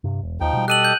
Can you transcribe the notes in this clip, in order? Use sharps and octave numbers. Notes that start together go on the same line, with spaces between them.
G2 C3
E1
D#2 F3 D#4 G5
B2 G3
G4 A4 D#5 F#6 D#7 F#7
G6